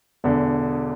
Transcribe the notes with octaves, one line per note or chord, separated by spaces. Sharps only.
E1 E2 D3